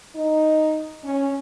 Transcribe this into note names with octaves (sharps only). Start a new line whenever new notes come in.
D#4
C#4